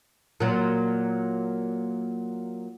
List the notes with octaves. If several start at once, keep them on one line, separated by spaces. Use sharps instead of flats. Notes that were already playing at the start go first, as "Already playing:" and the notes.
A#2 F#3